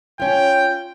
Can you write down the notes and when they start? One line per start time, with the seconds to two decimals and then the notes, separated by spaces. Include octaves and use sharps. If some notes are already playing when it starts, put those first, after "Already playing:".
0.20 C#4 F4 G5